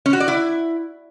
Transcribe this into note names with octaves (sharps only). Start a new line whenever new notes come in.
C#4
F#4
D5
E4